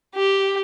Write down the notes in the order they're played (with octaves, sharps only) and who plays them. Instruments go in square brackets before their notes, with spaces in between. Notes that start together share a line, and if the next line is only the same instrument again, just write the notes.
[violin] G4